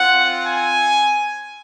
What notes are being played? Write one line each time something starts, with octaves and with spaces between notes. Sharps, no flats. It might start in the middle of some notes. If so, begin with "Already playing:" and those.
Already playing: C4 F4 F#5
G#5